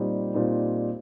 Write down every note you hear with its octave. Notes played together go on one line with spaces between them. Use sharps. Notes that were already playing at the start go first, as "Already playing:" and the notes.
Already playing: A#2 G3 C4 D#4
A#2 G3 C4 D#4